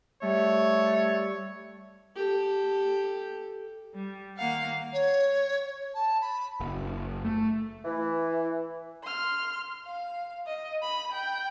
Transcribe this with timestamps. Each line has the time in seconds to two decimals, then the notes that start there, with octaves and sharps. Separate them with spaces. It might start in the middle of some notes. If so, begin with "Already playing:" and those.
0.22 G3 A3 C#5
2.16 G4 A4
3.94 G3
4.37 D#3 A#3 F5 F#5
4.93 C#5
5.94 A5
6.21 B5
6.60 F#1
7.25 A3
7.85 E3
9.04 C6 F6
9.87 F5
10.47 D#5
10.82 B5
11.13 G5